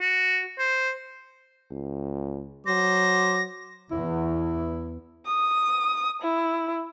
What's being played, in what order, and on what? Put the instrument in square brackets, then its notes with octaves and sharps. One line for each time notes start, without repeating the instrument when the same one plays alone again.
[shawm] F#4
C5
[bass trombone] C#2
[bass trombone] F#3 [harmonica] C5 D6 [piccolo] A#6
[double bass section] E2 [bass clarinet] E4
[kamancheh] D#6
E4